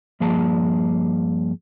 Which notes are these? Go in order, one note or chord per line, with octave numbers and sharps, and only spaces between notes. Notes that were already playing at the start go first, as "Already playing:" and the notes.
G2 F3 A#3 G#4 A5